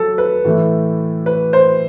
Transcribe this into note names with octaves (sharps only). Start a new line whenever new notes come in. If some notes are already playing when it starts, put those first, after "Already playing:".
Already playing: F#3 A4
B4
A2 E3 A3
B4
C5